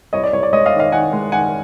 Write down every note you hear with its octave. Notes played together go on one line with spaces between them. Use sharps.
C2 C#5 D#5
D5
C2 C#5
D5
G#3 C#5 D#5
D#5 F5
D#3
D#5 F5
D#3 F#5 G#5
G#3
D#3 F#5 G#5